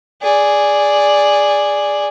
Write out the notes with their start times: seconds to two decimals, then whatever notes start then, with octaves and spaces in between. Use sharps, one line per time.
0.23 G#4 D5